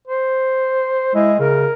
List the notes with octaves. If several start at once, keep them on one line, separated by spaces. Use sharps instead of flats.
C5
G#3 E4
C#3 A#4